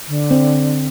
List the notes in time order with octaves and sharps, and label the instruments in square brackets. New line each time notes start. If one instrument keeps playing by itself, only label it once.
[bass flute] D3
[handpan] C4